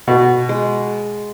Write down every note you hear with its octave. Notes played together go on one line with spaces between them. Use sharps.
B2
G#3